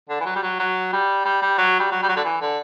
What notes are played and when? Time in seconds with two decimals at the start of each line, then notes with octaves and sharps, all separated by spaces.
0.09 D3
0.20 E3
0.26 F#3
0.36 G3
0.43 F#3
0.59 F#3
0.93 G3
1.25 G3
1.42 G3
1.58 F#3
1.80 G3
1.91 F#3
2.03 G3
2.08 F#3
2.17 D3
2.24 E3
2.41 D3